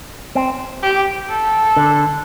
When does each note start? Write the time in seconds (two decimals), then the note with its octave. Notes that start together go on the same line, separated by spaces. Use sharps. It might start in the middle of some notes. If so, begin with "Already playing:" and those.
0.35 C4
0.83 G4
1.29 A4
1.76 D3